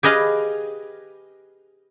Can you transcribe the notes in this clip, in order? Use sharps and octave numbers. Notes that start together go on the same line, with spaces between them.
G4 G#4 B4 D#5 F5